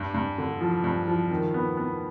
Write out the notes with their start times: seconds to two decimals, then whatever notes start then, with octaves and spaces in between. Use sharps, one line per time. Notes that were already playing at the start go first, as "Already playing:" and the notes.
Already playing: G2
0.14 G2
0.38 D3
0.61 F3
0.84 G2
1.08 F3
1.31 D#3
1.54 B3
1.77 B3